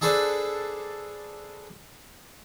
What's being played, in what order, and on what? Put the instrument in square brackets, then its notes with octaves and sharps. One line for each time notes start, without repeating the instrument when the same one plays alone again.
[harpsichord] D4 G#4 A4 B4 C5 D5